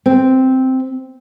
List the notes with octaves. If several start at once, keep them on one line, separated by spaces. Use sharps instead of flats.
C4